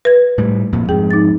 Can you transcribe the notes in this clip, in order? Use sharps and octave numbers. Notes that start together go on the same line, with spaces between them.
B4 G#6
A2 G3
F2 A#2
F2 G#2 G#4 G5
D#4 A6